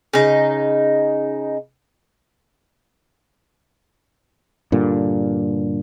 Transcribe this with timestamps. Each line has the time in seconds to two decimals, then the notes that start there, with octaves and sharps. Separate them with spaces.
0.13 C#3 D#4
4.72 G2 A#2 D3